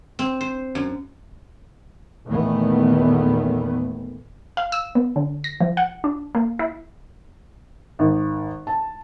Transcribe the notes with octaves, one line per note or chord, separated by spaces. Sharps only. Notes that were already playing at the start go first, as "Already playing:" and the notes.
C4
C5
F#2
E2 A#2 D#3 E3 A3 B3
F5
E6
B3
D3
A#6
F3
F#5
D4
A#3
E4
G#1
A5